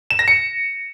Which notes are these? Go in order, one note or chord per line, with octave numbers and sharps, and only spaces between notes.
E7
A#6
C#7